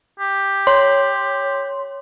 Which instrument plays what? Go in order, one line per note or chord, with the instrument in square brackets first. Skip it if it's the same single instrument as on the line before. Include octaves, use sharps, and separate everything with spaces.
[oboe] G4
[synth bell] C#5 C6